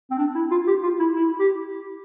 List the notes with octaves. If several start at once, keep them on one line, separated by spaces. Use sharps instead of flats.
C4
D4
E4
F4
G4
F4
E4
E4
G4